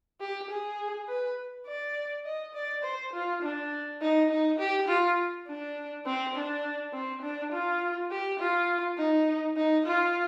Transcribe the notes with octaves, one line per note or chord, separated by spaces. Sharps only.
G4
G#4
B4
D5
D#5
D5
C5
F4
D4
D#4
D#4
G4
F4
D4
C4
D4
C4
D4
F4
G4
F4
D#4
D#4
F4